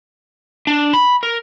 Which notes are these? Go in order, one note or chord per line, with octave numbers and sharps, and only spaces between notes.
D4
B5
A#4